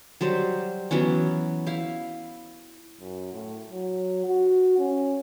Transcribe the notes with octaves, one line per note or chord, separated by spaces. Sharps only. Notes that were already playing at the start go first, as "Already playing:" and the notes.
F#3 G3 C5
E3 F#3 B3 C#4
E4 F5
F#2
A2
F#3
F#4
C#4